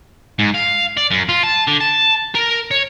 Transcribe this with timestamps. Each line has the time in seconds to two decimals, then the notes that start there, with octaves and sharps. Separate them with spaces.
0.39 G#2
0.54 F5
0.97 D5
1.11 F#2
1.29 F4
1.43 A5
1.68 D3
1.81 A5
2.35 A#4
2.71 C#5